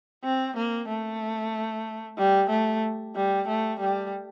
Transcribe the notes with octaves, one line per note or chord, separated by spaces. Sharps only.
C4
A#3
A3
G3
A3
G3
A3
G3